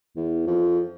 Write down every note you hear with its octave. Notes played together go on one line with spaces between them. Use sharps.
E2
F2